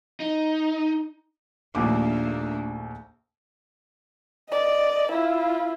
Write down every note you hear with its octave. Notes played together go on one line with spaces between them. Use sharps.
D#4
A#1 D#2 A3 A#3 D4 D6
D5 D#5
E4 F4